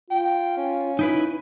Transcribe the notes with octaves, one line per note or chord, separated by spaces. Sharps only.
F4 G5
C#4
D#4 E4 B4